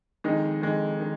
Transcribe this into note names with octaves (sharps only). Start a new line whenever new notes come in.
F2 D#3 G#3 D#4
F2 D#3 G#3 D#4
D#3